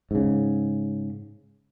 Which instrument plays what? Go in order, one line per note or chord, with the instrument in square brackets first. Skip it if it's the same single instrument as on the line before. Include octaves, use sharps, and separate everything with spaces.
[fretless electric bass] G#2 C#3